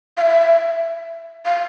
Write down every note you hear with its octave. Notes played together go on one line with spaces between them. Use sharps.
F5
E5
F5